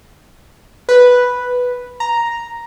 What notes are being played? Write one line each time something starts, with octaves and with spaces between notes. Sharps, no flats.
B4
A#5